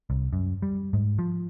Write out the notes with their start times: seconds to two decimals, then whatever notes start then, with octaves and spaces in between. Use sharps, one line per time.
0.10 C2
0.33 F#2
0.62 G3
0.93 G#2
1.18 F3